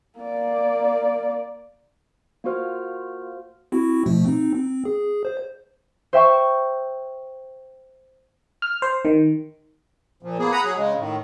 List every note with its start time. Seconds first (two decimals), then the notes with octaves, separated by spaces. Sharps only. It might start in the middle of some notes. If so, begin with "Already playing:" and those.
0.19 A#3 D5
2.44 A#3 F4 F#4 C5 F6
3.72 C4 E4 F#4
4.06 B2 F3 A3
4.25 C4 D#4
4.54 C4
4.85 G#4
5.25 C5
6.13 C5 E5 G5 C#6
8.62 F6
8.82 C5
9.05 D#3
10.23 A#2 F3
10.39 A#3 B3 G#4
10.52 F#5 A#5 B5 D#6
10.63 F#3 G#4
10.76 C#3 G#3
10.97 A2 D#3